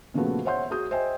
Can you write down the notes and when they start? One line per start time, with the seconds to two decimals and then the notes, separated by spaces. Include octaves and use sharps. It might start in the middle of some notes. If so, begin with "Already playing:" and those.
0.14 A#2 C#3 F3 A3 B3 F#4
0.45 C5 C#5 E5 F#5 C6 G6
0.71 F#4 G#4 D#6 G6
0.91 C5 D#5 E5 G5 G#5